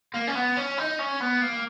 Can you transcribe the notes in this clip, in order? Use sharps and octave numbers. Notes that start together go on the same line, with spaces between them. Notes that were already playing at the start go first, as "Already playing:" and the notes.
A#3
C#4
B3
C#4
D#4
C#4
B3
A#3